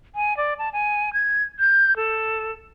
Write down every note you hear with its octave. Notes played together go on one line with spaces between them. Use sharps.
G#5
D5
A5
G#5
G#6
G6
A4